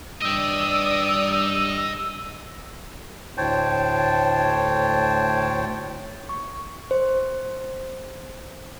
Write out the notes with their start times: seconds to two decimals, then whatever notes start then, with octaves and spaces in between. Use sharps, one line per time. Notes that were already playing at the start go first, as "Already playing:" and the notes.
0.22 G2 D5 D#5 G5 D#6 E6
3.38 D2 A2 C5 C#5 G5 A5
6.29 C#6
6.91 C5